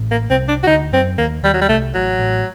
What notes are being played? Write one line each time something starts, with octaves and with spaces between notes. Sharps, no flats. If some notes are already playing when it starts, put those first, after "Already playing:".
Already playing: A1 A2
A#3
C2 C3 C4
D4
F#4
D2 D3 D#4
F#2 F#3 C4
D#2 D#3 A#3
D#2 D#3 G3
F#3
G3
C2 C3 A3
A1 A2 F#3
A1 A2